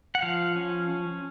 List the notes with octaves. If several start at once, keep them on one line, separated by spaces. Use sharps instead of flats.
F#5
F3 F5
C#4
C#4